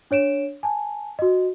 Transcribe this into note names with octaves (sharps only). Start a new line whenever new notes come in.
D4 C#5 D7 E7
G#5 A5
F#4 D#5